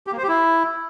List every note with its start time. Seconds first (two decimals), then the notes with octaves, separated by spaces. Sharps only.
0.07 G4
0.12 A#3
0.18 C5
0.23 G4
0.28 E4